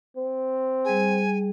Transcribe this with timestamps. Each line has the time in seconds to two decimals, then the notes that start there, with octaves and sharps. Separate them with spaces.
0.17 C4
0.85 G3 G#4 G#5